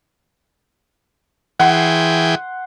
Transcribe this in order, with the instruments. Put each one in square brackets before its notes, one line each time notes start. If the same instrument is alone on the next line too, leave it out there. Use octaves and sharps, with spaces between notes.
[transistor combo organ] E3 G#4 G5 [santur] F#5 C6